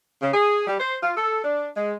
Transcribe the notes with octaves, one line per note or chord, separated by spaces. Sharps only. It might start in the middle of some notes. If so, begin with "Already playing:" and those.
C#3
G#4
G3
C5
F4
A4
D4
G#3